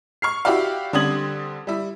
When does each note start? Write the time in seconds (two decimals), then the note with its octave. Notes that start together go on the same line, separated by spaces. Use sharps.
0.22 C#6 F6 C7
0.45 E4 F#4 G4 D5 F5
0.93 D3 G3 C4 D#6 G#6 F#7
1.67 G3 E4